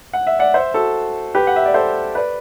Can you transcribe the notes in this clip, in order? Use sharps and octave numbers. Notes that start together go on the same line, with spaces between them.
F#5
E5
D5 F#5
C5 E5
F#4 A4
G4 B4
F#5
E5
D5
A4 C5
B4 D5